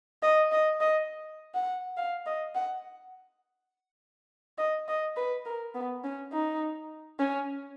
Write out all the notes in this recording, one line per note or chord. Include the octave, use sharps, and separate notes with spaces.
D#5
D#5
D#5
F#5
F5
D#5
F#5
D#5
D#5
B4
A#4
B3
C#4
D#4
C#4